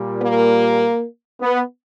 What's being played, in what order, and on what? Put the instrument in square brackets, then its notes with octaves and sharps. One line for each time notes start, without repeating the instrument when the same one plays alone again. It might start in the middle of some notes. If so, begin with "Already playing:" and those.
Already playing: [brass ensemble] A#2 G3
A#3
B3